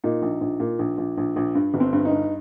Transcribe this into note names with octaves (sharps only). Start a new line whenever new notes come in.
A#2 D#4
A#1
A#1
A#2
A#1
A#1
A#1
A#1
G2
G1
C4
G2
D#4
G2